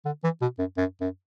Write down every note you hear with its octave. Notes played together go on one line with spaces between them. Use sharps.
D3
E3
B2
F#2
F#2
F#2